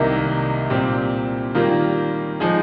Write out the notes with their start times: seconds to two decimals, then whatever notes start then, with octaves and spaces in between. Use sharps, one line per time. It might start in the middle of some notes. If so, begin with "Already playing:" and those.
Already playing: C2 C3 D#3 A#3 D#4
0.70 A#2 G3 C4 G4
1.54 D#3 G3 A#3 F4
2.40 F3 G#3 D#4 G#4